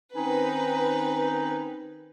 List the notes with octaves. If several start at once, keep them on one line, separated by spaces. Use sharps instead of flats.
D#3 C4 C#4 D#4 B4